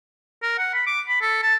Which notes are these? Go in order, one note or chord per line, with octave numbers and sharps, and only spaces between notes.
A#4
F#5
B5
D6
B5
A4
A5